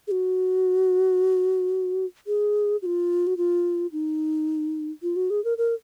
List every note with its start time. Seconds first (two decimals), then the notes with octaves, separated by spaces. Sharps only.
0.07 G#4
0.11 F#4
2.27 G#4
2.82 F#4
2.86 F4
3.27 F#4
3.37 F4
3.92 D#4
5.03 F4
5.16 F#4
5.30 G#4
5.44 A#4
5.58 A#4